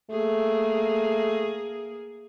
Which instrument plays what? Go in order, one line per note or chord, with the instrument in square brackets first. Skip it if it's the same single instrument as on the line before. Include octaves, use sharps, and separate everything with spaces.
[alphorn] A3 [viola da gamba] A#3 G#4